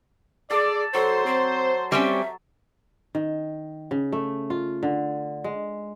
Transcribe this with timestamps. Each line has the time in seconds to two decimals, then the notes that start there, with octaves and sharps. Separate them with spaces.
0.51 G#4 A4 D5
0.94 F#3 A4 C5
1.26 C4
1.92 G3 C4 C#4 E5
3.15 D#3
3.91 C#3
4.12 A3
4.50 F4
4.83 D3
5.44 G#3